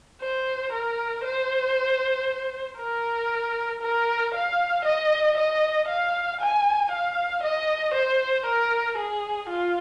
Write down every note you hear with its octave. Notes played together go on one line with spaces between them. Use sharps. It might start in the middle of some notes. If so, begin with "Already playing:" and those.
C5
A#4
C5
A#4
A#4
F5
D#5
D#5
F5
G#5
F5
D#5
C5
A#4
G#4
F4